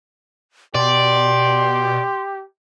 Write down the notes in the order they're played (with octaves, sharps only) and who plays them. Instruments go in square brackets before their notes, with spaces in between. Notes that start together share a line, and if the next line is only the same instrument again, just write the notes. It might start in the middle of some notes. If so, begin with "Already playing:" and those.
[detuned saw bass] B2 [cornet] G4 [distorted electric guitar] D5 [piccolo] C6